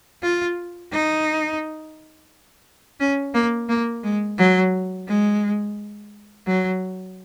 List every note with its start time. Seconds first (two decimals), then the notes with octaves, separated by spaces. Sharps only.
0.22 F4
0.92 D#4
3.00 C#4
3.34 A#3
3.69 A#3
4.03 G#3
4.38 F#3
5.08 G#3
6.46 F#3